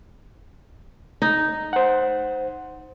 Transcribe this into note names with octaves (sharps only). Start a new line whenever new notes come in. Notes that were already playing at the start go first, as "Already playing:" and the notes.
D#4
C5 F#5